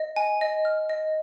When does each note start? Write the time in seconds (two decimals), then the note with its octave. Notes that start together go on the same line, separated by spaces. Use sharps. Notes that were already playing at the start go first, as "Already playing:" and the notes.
Already playing: D#5
0.16 G#5
0.41 D#5
0.65 F6
0.89 D#5